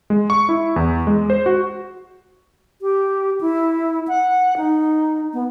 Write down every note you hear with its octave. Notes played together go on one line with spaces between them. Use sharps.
G#3
C#6
E4
E2
G#3
C5
F#4
G4
E4
F#5
D#4
B3